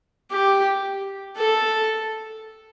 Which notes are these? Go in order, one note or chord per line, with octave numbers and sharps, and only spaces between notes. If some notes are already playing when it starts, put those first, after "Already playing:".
G4
A4